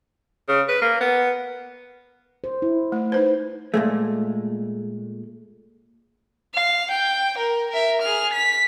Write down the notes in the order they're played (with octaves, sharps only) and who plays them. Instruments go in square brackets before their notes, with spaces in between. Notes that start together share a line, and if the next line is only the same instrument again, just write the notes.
[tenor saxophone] C#3
B4
A#3
B3
[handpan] C5
E4
[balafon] A3
D#4 B4 C5
[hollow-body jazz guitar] A#2 G#3 A3
[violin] F5
G5
A#4
A#4 E5
G#4 F6
B6